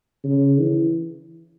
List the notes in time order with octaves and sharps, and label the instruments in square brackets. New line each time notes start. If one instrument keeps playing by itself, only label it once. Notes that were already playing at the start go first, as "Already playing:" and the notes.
[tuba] C#3
E3